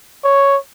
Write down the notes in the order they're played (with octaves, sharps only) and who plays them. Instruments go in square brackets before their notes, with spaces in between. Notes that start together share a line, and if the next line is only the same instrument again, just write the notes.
[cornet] C#5